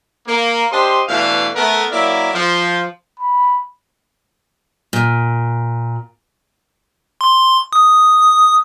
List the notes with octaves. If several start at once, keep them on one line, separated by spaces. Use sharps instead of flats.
A#3
D4 G4 C5 D#5 C6
B2 E3 A3 D4 F5
A3 B3 A#4
F#3 A#3 E4 A#4 D5 E5
F3
B5
A#2
C6
D#6